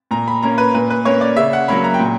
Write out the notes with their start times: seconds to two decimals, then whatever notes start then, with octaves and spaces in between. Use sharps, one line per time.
0.11 A#2 A#5
0.28 B5
0.43 A#3 C#4 A#5
0.58 B4
0.74 A#2 B4
0.90 B4
1.05 A#3 C#4 C#5
1.21 D5
1.36 C#3 E5
1.53 F#5
1.68 F#3 A#3 C#4 B5
1.84 A#5
1.94 G5
1.99 A#2